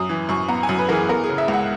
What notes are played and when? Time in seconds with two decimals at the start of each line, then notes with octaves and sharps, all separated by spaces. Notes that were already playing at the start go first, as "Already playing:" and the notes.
Already playing: F#2 D#6
0.09 E3
0.29 F#2 C#6
0.48 B3 A#5
0.63 G#5
0.69 F#2
0.78 B4
0.89 E3 G#4 A#4
1.09 B3 A#4
1.24 G#4
1.29 C#3
1.38 E5
1.48 C#2
1.54 F#5